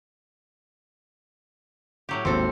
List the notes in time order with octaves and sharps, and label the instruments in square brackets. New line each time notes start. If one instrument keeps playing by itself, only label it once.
[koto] A2 F#3 G4
[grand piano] G#1 D#2 C5 [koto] C4 A4